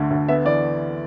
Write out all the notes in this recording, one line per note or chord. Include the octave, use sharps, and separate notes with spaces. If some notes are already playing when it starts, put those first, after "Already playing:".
Already playing: D2 D3 A3
D2
B3 E5
E3 D5